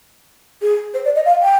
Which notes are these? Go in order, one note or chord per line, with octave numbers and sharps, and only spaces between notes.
G#4
C5
D5
D#5
F5
G5